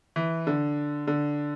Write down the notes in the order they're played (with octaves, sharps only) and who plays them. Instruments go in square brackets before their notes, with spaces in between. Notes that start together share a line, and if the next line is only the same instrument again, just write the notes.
[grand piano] E3
D3
D3